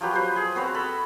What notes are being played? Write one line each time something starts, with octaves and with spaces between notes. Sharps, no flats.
F3 F#3 G4 B4
B4 C5
G#4
C4 F#4 B4 C#5
A4 B5